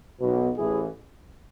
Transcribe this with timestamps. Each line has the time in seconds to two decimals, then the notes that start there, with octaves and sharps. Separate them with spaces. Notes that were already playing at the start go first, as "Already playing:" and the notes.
0.20 B1 B2
0.57 A1 A2 E3 E4 G#4